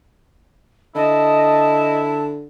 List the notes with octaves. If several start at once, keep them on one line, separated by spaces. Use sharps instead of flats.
D3 E4 D#5 A5